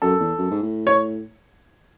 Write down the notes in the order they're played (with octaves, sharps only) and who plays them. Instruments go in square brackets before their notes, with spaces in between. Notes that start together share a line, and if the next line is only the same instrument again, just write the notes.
[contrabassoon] F#2 [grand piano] A4
[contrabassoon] E2
F#2
G#2
A2
[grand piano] C#5